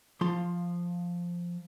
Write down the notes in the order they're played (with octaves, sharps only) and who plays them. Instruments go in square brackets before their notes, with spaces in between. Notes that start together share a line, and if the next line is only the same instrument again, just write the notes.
[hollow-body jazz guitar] F3 F4 C6